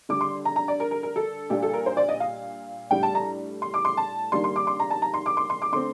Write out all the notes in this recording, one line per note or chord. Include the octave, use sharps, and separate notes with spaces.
D3 G3 D4 D6
C6
A#5
A#5
D5
A#4
A#4
A#4
A4
A#2 G3 D4 G4
A4
A#4
C5
D5
D#5
F5
A2 G3 D4 G5
A5
A#5
C6
D6
C6
A5
D#3 G3 A#3 D4 C6
C6
D6
C6
A#5
A5
A#5
C6
D6
C6
C6
D6
D3 A3 C4 C6